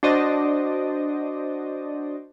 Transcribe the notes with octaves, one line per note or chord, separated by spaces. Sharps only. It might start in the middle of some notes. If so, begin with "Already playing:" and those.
D4 F#4 C5 D5 D#5